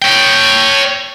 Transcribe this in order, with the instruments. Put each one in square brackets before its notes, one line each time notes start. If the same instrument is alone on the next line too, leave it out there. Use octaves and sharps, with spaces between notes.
[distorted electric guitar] C#5 G5